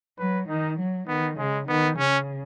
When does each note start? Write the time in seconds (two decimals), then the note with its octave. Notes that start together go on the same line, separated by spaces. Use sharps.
0.19 F#3 B4
0.49 D#3 D#4
0.78 F#3
1.08 D#3 B3
1.38 C#3 G#3
1.68 D#3 B3
1.97 C#3 C#4